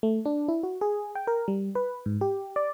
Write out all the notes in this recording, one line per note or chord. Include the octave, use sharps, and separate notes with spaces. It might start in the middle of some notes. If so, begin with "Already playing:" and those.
A3
D4
E4
F#4
G#4
G5
A#4
G3
B4
G#2
G4
D5